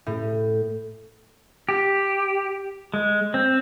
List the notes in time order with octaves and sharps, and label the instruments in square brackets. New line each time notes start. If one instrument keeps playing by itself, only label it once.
[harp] A2
[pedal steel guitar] G4
G#3
C4